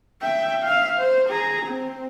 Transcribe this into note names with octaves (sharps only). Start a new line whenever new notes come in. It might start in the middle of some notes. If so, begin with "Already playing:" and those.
E5 G5
E5 F5
C5
G#4 A#5
C4